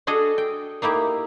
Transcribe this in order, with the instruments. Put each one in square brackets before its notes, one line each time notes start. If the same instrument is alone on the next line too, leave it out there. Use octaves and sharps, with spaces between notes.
[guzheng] D4 F#4 G#4 A4 D#5
G5
A#3 D#4 E4 G4